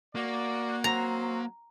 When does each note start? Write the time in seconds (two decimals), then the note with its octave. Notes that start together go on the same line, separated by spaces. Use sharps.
0.15 A#3 F#4 D5
0.84 F#3 C4 F#4 A#5